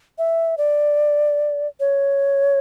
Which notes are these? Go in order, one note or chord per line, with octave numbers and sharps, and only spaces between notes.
E5
D5
C#5